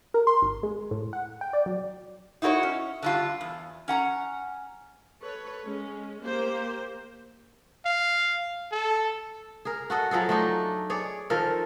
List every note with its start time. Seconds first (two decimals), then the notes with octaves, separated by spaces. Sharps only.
0.14 A#4
0.27 C6
0.42 G#1
0.63 G#3
0.91 A2
1.13 F#5
1.41 G5
1.53 D5
1.66 F#3
2.42 D#4 E4 F#4 A#4 C#5
2.63 C#4
3.02 D3 G3 F4
3.41 E2
3.88 C#4 F#5 A#5
5.21 A4 B4 C#5
5.66 G#3 C#4
6.21 A#3 G4 C5
7.86 F5
8.72 A4
9.65 G#4 A#4
9.90 F#4 A4 D#5
10.11 F3 F#3 G#4 A4
10.29 A3 D4 D#4
10.90 G#4 C#5 D5
11.30 D#3 F3 A4 A#4